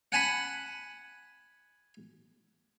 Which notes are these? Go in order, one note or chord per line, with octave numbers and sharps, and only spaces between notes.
F#5 G#5 A5 B5